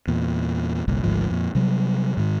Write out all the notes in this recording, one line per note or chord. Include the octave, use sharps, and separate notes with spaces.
E2 A#2
G1 C2 A#2
G#1 D2 G#2 F3
F2 A#2
C3 F#3 G3
G#2 D#3